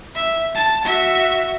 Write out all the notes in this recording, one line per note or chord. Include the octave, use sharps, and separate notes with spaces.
E5
A5
F#4 E5